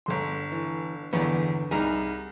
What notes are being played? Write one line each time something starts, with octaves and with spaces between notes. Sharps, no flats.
G1 D3 C6
E3
G1 E2 D3 E3 B3
C2 G3 D#4 G#4